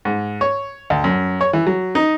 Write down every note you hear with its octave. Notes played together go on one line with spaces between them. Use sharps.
G#2
C#5
D2
F#2
C#5
E3
F#3
D#4